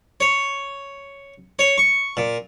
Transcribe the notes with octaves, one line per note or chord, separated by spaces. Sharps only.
C#5
C#5
C#6
A#2